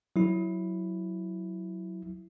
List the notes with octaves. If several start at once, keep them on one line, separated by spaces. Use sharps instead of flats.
F#3 E4